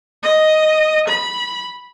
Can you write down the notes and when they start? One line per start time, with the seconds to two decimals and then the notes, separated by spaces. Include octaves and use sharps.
0.23 D#5
1.08 B5